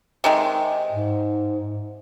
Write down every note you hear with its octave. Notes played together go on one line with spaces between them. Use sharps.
C3 D#3 G#3
G#2